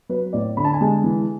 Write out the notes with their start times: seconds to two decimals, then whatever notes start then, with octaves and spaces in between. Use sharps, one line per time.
0.09 F#3 B4
0.33 A2 D5
0.57 D3 B5
0.64 A5
0.73 G#5
0.81 G#3 A5
1.04 E3